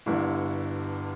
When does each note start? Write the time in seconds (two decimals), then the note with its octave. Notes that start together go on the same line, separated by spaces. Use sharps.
0.06 G1 G2 D3 E4